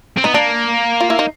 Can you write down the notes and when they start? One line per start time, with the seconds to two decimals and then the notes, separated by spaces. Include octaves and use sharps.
0.17 C4
0.24 B3 D#4
0.34 A#3 D4
1.01 F4
1.10 E4
1.19 D#4